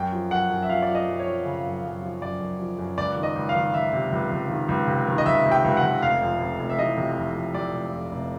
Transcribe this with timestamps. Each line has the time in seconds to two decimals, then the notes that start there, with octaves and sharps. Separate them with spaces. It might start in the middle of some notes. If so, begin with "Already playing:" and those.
Already playing: F#2 G5
0.12 F3
0.31 F#2 F#5
0.50 F#2
0.62 E5
0.69 F3 F5
0.82 D5
0.88 F3
0.95 D#5
1.08 F#2
1.20 C#5
1.27 F3
1.45 C#3
1.65 F#2
1.84 F#2
2.02 F3
2.22 F#2 D5
2.41 F#2
2.59 F3
2.79 F#2
2.98 C#2 D5
3.16 D#3
3.23 D#5
3.36 C#2
3.49 F5
3.55 D#3
3.74 D#3 E5
3.93 C3
4.12 C#2
4.31 C#2
4.50 D#3
4.69 C#2
4.88 C3
5.07 D#3
5.18 D#5
5.26 C#2 E5
5.46 C3
5.52 G5
5.64 C#2
5.77 F#5
5.83 C#2
6.02 F1 F5
6.22 F2
6.40 F1
6.59 F1
6.70 E5
6.78 E3 D#5
6.98 C3
7.17 F2
7.35 F2
7.54 C3 D5
7.73 F1
7.92 F2
8.12 F1